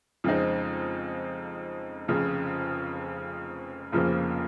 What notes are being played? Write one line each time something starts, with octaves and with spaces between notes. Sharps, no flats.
F2 C#3 G#3 C4 D#4
F1 F2 C#3
F1 F2 C#3 F3 A#3